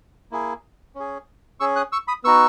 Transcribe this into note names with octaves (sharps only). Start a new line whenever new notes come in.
A#3 E4 G#4
C#4 G#4
C#4 G#4 C#6 E6
D#6 F#6
C#6 E6
B5 D#6
B3 D#4 F#4 C#6 E6